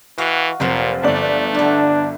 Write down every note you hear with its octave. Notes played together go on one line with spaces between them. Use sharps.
E3 F#4 D#5 F5
F1 A#2 F3 F#3 C5
G1 A3 D5
D3 D4 E4